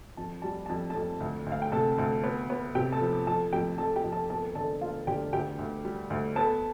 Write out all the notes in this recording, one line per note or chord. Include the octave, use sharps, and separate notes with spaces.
F2 A5
G3 A5
F2 A5
F2 A4 A5
D2
D2
F5
G5
C3 A4 A5
D2
B3
B3
C3 G4 G5
A4 A5
F3
F2 A4 A5
F2 G4 G5
F2 A4 A5
G4 G5
F2
A4 A5
E1 A4 A5
D3 A4 A5
E1 F4 F5
D3 G4 G5
D2 G4 G5
D2
G3
D2
B3 A4 A5